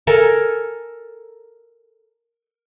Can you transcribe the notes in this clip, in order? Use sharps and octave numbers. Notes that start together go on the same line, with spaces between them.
A4 A#4 G#5